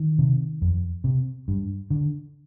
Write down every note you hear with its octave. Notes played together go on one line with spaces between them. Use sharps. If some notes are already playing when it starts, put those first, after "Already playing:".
Already playing: D#3
C3
F2
C3
G2
D3